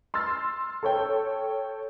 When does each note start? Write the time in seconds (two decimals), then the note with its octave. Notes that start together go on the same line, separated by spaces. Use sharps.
0.14 C6 E6 F6 A6
0.83 A4 C#5 G5